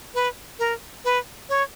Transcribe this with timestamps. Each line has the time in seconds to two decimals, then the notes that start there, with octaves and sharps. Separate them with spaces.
0.15 B4
0.59 A#4
1.05 B4
1.49 C#5